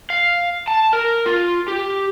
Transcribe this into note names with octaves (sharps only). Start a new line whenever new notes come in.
F5
A5
A#4
F4
G4